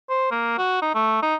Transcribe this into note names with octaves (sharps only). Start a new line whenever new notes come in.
C5
A#3
F#4
D#4
A3
D#4